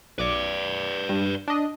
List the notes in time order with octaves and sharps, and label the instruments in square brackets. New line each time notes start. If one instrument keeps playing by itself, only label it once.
[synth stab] B1 D6 [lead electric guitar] B4 D5
[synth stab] G2
D4 D#5